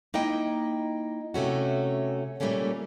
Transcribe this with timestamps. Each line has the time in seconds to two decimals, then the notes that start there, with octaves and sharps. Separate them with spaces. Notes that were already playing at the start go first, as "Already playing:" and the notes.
0.14 A#3 D#4 E4 D#5 G5
1.34 C3 A3 C#4 F#4
2.40 A#2 G3 A3 A#3 C#4 A4